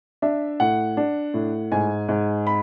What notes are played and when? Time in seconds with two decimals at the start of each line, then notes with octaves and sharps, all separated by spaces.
0.22 D4 E5
0.60 A2 F#5
0.97 D4
1.34 A2
1.72 G#2 G#5
2.09 G#2
2.47 B5